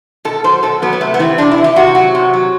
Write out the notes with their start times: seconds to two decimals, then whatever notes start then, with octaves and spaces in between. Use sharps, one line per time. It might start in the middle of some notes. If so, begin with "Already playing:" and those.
0.25 B2 A4
0.44 F#3 C5
0.63 B2 A4
0.82 F#3 B3
0.93 B3
1.01 C3 A3
1.14 B3
1.19 E3 C4
1.38 C3 D4
1.51 E4
1.58 E3
1.64 G4
1.76 C3 F#4
1.95 F#3 F#4
2.15 C3
2.34 F#3